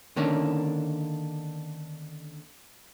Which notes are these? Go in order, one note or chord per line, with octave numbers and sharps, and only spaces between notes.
D3 D#3 A#3 C#4 D4